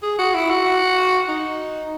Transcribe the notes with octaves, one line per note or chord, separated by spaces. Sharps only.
G#4
F#4
E4
F#4
D#4